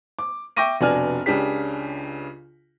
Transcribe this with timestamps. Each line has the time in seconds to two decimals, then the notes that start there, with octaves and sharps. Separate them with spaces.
0.19 D6
0.57 E5 G5 C#6 D6 A#6 D#7
0.81 F1 B2 D4 D5 G#5 F6
1.26 C#2 C#3 D4 G4 B6